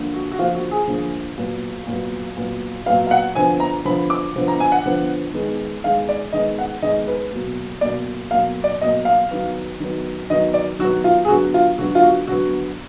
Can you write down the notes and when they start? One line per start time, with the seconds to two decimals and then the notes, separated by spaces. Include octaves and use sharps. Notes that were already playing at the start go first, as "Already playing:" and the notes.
Already playing: D3 F3 A#3
0.14 F#4
0.32 F#4
0.39 D3 F3 A#3 F4
0.55 F#4
0.71 G#4
0.87 D3 F3 A#3
1.38 A#2 F#3 B3
1.87 A#2 F#3 B3
2.37 A#2 F#3 B3
2.86 A#2 F#3 B3 F5
3.07 F5
3.11 F#5
3.35 D3 F3 B3 G#5
3.60 A#5
3.85 D3 F3 B3 B5
4.10 D6
4.35 D3 F3 B3
4.48 A#5
4.60 G#5
4.72 F#5
4.85 D3 F3 B3
5.34 D#3 G#3 B3
5.84 D#3 G#3 B3 F5
6.09 D5
6.33 D#3 G#3 B3 D#5
6.59 F#5
6.82 D#3 G#3 B3 D#5
7.08 B4
7.32 B2 F#3 A#3
7.81 B2 F#3 A#3 D5
8.31 B2 F#3 A#3 F5
8.64 D5
8.81 B2 F#3 A#3 D#5
9.05 F5
9.31 D#3 F#3 B3
9.80 D#3 F#3 B3
10.30 D#3 F#3 B3 D#5
10.54 D5
10.79 D#3 F#3 B3 F#4
11.04 F4
11.25 G#4
11.28 D3 F#3 B3 F#4
11.54 F4
11.78 D3 F#3 B3 F#4
11.95 F4
12.03 F#4
12.27 D3 F#3 B3 F#4